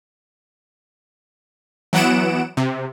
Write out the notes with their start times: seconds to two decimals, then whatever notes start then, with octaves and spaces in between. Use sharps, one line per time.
1.93 E3 F#3 B3 F#5 D7 E7
2.57 C3